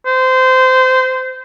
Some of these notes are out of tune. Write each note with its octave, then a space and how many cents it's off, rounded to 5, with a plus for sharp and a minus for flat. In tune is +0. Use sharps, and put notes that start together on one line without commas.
C5 -20